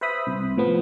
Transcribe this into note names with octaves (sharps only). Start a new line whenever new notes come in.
B4 C5 E5 B5 D#6
C2
A2 F3 B3